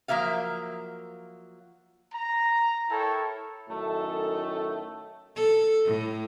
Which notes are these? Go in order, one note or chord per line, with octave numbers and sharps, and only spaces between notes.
F3 F#3 A#3 E5 F5
A#5
E4 A4 A#4 C#5 G5 A5
F#2 A2 D#3 A3 A4
A4
A2